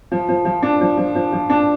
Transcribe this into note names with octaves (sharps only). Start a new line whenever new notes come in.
F3
F3
F3
D4
F3
F3
F3
F3
D4